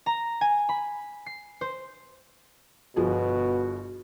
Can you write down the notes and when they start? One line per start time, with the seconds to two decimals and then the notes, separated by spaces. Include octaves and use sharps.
0.06 A#5
0.41 G#5
0.69 B5
1.26 C7
1.61 C5
2.96 G1 B2 F3 F#4 G#4